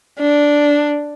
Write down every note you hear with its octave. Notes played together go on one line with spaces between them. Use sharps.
D4